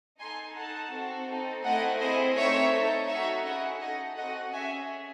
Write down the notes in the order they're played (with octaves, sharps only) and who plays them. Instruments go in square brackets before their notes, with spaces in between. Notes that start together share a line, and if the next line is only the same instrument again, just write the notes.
[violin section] D#4 A4 G#5 C6
D#4 A4 F#5 A5
C4 F#4 A4
C4 D#4 A4
A3 C4 E4 D#5 F#5
C4 E4 G#4 C5 D#5
A3 C4 D#4 C#5 E5
D#4 A4
D#4 F#4 A4 C#5 E5
C#4 E4 G#4 D#5 F#5
D#4 A4 D#5 F#5
C4 F#4 A4 D#5 F#5
C#4 G#4 E5 G#5